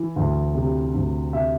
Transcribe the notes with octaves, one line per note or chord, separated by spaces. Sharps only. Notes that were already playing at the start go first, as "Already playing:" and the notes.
Already playing: E3
D2
C3
D2
C3 E5